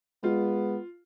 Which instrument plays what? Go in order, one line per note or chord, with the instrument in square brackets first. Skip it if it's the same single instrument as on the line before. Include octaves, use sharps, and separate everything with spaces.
[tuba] G#3 [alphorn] B3 [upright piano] F4